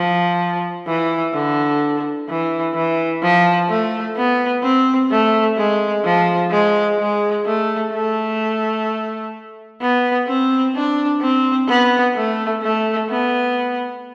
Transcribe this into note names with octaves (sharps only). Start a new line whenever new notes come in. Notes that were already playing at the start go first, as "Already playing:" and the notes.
Already playing: F3
E3
D3
E3
E3
F3
A3
B3
C4
A3
G#3
F3
G#3
G#3
A3
A3
B3
C4
D4
C4
B3
A3
A3
B3